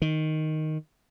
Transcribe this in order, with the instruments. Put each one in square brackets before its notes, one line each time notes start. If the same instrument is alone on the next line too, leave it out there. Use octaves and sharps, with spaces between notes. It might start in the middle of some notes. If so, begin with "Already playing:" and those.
[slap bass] D#3